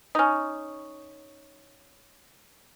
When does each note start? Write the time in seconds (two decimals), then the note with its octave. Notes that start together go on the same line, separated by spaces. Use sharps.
0.15 C#4 D#4